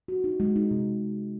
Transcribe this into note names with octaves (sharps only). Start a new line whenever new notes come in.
F#4
D#4
G#3
D#4
C3